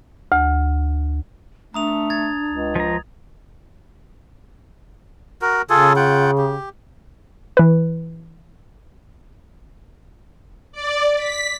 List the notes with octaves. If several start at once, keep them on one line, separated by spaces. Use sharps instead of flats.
D2
A3 D4 A#5 D#6 F7
G#6 A6
C#2
F3 A#5
F#4 A#4
C#3 F4 G#4 A4
F4 F#5 G5
G4
E3 B4
D5
B6